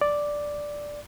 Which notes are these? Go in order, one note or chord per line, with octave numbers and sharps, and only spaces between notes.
D5